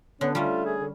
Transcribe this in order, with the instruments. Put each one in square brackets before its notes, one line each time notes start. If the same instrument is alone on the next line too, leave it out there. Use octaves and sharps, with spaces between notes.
[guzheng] D3 [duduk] B3 [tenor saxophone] C#4
[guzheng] G3 C#4 [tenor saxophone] A3 [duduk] F4
[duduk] G#4
[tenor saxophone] D3